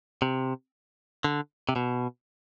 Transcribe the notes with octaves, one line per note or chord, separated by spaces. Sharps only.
C3
D3
C3
B2